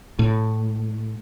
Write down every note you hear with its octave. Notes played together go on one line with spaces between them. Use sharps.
A2